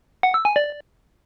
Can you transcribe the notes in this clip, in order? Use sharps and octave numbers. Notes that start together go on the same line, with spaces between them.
F#5
E6
G#5
D5